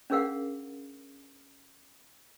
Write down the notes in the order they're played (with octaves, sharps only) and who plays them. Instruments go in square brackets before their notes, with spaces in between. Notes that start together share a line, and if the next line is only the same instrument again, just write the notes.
[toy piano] C#4 D4 G#4 A#4 F5 F#5